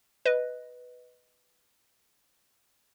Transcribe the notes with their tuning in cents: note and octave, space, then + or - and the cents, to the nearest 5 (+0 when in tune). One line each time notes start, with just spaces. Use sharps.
B4 +0 D#5 +0